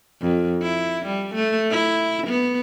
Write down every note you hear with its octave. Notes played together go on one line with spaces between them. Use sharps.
F2
E4
G3
A3
E4
B3